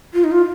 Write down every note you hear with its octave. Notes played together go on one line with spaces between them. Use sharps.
F4
D#4
F4